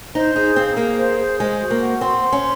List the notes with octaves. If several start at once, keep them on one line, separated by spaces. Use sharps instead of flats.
D#4 C5
D#4 G#4
C4 F5
A#3 G#4
C5
G#4
G#3 C5
F#4
A#3
F#5
C4 C6
C5
C#4